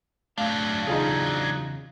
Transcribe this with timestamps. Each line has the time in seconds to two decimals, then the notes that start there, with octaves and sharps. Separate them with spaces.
0.38 F#3 A3 D4 F5
0.87 E2 C#3 D#4 F4 G#4